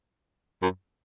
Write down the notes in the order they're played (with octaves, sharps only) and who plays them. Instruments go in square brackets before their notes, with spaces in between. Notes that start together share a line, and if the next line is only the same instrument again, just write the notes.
[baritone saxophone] F#2